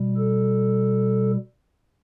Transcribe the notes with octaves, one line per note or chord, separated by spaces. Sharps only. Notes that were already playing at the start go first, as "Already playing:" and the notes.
Already playing: B2 G3
A4